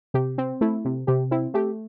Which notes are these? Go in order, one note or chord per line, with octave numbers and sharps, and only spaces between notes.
C3 G4
C4
A3 E4
C3
C3 G4
C4 E4
A3 G4